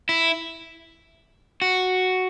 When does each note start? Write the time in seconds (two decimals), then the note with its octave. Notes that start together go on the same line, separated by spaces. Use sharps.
0.09 E4
1.62 F#4